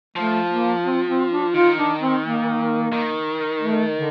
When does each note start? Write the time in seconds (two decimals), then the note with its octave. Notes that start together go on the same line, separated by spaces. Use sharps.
0.16 F3 A3
0.50 A#3
0.84 C4
1.08 C4
1.31 D4
1.53 D#3 F4
1.77 D4
2.00 C4
2.23 A#3
2.92 D#3
3.61 A3
3.95 D3